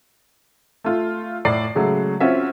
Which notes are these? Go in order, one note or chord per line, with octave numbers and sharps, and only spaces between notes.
A3 F4
A2 D5 C7
C#3 F#3 G#3 A3
C4 C#4 F4 F#4 E5